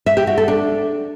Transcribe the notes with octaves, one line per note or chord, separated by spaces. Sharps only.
E5
G4
F#4
A4
D4